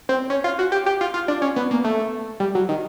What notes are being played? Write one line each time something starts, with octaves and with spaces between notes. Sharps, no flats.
C4
C#4
F4
F#4
G4
G4
F4
F4
D4
C#4
B3
A#3
A3
G3
F#3
D#3